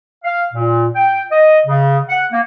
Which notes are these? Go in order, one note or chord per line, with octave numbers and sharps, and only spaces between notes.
F5
A#2
G5
D#5
C#3
F#5
A#3